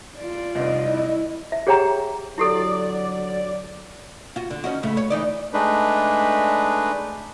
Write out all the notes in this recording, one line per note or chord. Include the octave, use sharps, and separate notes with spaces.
F4 D5
F1 C2 D#5
E4
E5
G4 G#4 C#5 F#5 G5 A#5
D3 F#3 E4 G4 A4 D5
F4 F#4
D3
C#4 D#4 F#4
A2 C#3 A3
C#5
E3 D#4 D5
G#3 A3 D4 D#4 B4